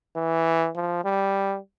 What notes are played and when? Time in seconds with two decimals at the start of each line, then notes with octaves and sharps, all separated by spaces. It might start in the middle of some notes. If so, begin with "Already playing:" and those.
0.16 E3
0.76 F3
1.05 G3